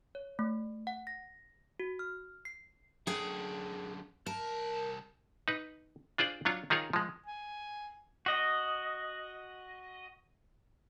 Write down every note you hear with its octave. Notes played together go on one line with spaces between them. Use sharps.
C#5
A3
F#5
A#6
F#4
F6
C7
F#2 D3 G#4 G5
C2 A#4 A5
D#4 B4
D4 F4 G#4 C5 D5
F#3 D4 F4 C#5
D#3 D#4 F4 G#4 A#4 C#5
F3 G#3
G#5
F#4 D#5